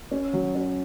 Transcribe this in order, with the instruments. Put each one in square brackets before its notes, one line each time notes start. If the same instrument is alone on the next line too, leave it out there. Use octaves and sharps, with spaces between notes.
[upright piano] C#4
F#3
C#4